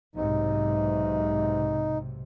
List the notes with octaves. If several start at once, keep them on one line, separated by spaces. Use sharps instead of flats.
B1 G#2 C3 D#4